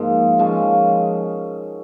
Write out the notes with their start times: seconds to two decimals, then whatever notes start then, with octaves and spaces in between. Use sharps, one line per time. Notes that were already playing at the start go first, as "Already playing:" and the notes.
Already playing: G#2 F3 A#3
0.38 C#3 F3 G#3 C#4